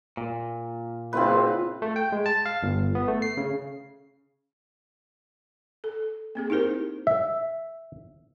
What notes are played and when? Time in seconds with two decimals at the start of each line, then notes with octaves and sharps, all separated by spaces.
0.17 A#2
1.13 F#1 C4 F4 B4
1.82 A3
1.96 G5
2.12 G#3
2.26 A5
2.46 F5
2.63 G1
2.95 B3
3.08 A3
3.22 C7
3.37 C#3
5.84 A4
6.35 A#3 C4 G#4
6.50 D#4 E4 G4 A#4 C5
7.07 E5